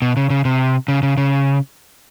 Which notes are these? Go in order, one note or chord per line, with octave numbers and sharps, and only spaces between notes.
B2
C#3
C#3
C3
C#3
C#3
C#3